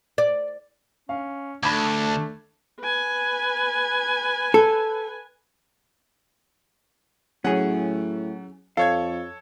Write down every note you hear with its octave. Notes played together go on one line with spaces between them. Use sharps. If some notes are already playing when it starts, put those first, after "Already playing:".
D5
C#4 F5
D2 A3 D4 B5 G#6
B4 G#5
A4
A2 F#3 C#4 G#4 F#5
F2 A4 C#5 F5 G#6